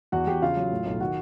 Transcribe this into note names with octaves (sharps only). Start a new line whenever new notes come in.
E2 F#4 F#5
E2 G4 G5
C#3 F4 F5
F#3
A2
B1
D#3 F#4 F#5